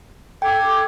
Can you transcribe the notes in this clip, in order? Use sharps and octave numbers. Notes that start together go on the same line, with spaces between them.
A4 G5 D6 G#6